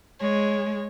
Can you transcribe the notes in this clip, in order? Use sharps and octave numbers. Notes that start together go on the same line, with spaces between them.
G#3 C#5